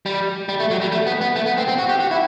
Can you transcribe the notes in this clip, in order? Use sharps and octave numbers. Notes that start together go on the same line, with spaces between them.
G3
G3
A3
F#3
G3
A3
B3
B3
A3
B3
C4
C4
F#4
G4
F#4
E4